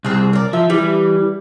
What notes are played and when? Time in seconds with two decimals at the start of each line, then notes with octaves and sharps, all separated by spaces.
0.05 C2 C4 G#4
0.33 A#4 D5
0.53 F3 E5
0.70 E3 G3